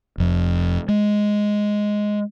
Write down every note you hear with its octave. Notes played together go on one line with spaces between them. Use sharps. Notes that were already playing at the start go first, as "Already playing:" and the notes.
F1 F2
G#3